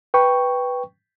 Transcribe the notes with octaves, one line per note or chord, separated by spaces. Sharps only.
B4 G5 C#6